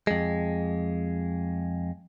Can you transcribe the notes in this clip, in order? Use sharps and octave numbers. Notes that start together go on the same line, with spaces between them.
F2 G#3